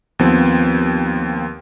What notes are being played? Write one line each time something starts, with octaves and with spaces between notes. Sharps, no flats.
D#2 F3 B3 C4